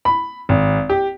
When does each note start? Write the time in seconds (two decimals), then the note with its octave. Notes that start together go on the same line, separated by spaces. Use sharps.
0.05 B5
0.49 G#1
0.90 G4